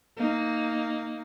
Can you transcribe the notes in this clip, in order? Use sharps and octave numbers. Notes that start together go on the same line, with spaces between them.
A#3 D#4